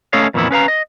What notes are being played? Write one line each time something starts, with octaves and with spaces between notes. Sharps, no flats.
A3 C#4 A4 C#5 D#5 F5
F2 A#2 D#3 E3 B3 E4
C#4 B4 F5 A#5
D#5